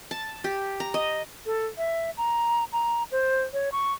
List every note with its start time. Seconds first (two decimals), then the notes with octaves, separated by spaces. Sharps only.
0.11 A5
0.44 G4
0.80 A#5
0.94 D#5
1.46 A4
1.77 E5
2.17 A#5
2.72 A#5
3.12 C5
3.53 C#5
3.72 C#6